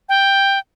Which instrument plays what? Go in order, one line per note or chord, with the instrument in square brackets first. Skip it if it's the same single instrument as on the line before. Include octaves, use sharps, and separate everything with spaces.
[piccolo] G5